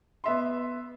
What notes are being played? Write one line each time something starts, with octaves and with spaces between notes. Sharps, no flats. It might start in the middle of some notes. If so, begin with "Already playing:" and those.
B3 E5 C6